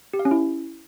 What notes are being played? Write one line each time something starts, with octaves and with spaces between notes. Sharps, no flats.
G4
F5
C#4
E4